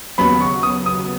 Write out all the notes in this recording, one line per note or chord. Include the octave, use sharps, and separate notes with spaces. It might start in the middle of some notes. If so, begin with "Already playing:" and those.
D#2 C#3 F#3 B3 B5
C#6
D#6
D#6